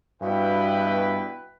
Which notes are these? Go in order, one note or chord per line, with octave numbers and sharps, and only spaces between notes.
G2 B2 E4 B4 G5